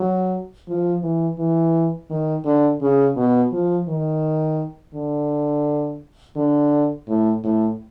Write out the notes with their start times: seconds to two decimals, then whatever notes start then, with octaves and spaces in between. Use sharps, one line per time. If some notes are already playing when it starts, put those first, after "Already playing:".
Already playing: F#3
0.68 F3
1.03 E3
1.39 E3
2.10 D#3
2.45 D3
2.81 C#3
3.16 B2
3.52 F3
3.88 D#3
4.94 D3
6.36 D3
7.08 A2
7.44 A2